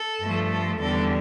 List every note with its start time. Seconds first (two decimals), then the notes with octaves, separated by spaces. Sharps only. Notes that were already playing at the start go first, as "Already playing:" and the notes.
Already playing: A4
0.21 G2 F3 A3
0.50 A4
0.79 E2 D3 G3 A4